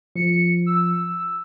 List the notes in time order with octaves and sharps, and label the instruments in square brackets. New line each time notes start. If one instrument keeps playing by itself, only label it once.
[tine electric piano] F3 [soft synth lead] C#7
[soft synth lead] E6